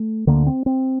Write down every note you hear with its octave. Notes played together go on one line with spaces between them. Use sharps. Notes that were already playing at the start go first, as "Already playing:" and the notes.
Already playing: A3
D2 D3 A#3
C4
C4